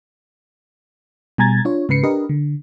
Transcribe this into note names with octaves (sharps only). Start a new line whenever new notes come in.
B2 G3 G#5 A#5 G#6 A6
D4 F4 C#5
G#2 C#3 B4 C7 C#7
D4 G4 A#4 B4 D#5
D3